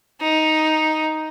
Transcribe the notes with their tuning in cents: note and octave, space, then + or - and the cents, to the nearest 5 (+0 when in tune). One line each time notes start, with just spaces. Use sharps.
D#4 +5